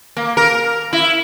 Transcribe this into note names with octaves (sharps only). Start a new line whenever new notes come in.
A#3
A#4
E4